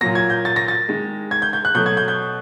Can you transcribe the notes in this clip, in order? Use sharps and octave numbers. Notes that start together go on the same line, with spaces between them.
A#2 F#3 A#3 A#6
G#6
G6
A6
A#6
A6
D#3 G#3
G#6
G6
G6
F#6
B2 F#3 A3 G6
G#6
G6
G6